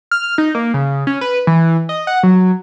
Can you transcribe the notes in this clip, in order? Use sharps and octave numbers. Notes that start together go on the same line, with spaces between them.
F6
D#4
A#3
C#3
C#4
B4
E3
D#5
F#5
F#3